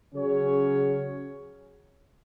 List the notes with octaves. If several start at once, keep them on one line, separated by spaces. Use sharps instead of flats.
C#3 F#3 C#4 G#4 C#5